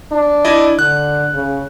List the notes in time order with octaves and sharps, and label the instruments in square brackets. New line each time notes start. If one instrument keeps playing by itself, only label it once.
[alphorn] D4
[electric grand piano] E4 D5 D#5
[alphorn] D3 [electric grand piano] F#6
[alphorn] C#3